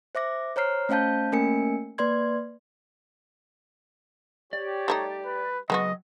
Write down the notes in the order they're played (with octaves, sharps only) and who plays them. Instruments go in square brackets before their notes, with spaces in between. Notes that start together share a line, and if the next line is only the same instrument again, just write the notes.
[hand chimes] C5 E5 D6 A#6
C5 C#5 A#5 F6 C7
A3 C#4 C5 F5 A5 G6
A3 A#3 C#4 A#4 G#5 C#7
A#3 B4 D5 C6 G#6
[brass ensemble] G4 [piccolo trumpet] C#5 [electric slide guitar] D5
[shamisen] G3 A3 D#4
[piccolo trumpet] B4
[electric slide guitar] C#3 F#3 [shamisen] G#3 B3 F#4 [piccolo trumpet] D#5